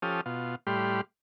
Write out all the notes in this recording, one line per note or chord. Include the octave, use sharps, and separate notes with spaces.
F3 C#4 G4 A4 D#6 F6
B2 F4
A2 G3 G4 B5 C6 F6